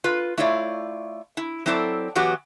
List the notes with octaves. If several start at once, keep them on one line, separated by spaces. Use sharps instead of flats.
F4 B4
A3 E4 F4 C#5 D5
E4
F#3 C4 E4 A4 C5 D5
E3 F#3 B3 F#4 G4